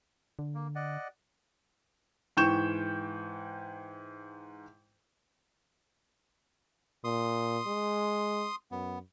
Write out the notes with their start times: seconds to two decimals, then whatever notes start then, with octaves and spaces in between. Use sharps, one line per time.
0.39 D3
0.55 A#3
0.75 D5 D#5 F#5
2.37 G#2 E3 G5 C#6 G6 E7
7.04 A#2 C6 D#6
7.66 G#3
8.71 F#2 B3